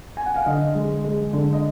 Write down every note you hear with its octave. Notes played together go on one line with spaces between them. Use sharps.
G#5
F#5
F5
D3 D#5
G#3
G#3
D3
D#5